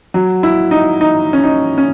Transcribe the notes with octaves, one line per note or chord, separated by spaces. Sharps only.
F#3
E4
D#4
D#4
C#4
D#4
C#4